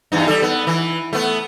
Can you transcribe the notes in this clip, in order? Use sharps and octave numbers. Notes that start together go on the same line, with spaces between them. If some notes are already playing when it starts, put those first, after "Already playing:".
E2 G2 D#4
G3 A4
B3
E3
A3 B3